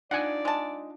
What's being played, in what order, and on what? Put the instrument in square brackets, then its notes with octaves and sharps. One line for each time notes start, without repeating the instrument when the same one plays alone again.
[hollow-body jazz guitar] D4 D#4 F4 [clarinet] D5 [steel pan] F#5 G#5
[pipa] G#3 A5